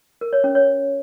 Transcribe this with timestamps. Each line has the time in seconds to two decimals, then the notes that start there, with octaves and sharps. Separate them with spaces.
0.21 A#4
0.33 C#5
0.44 C#4
0.55 C#5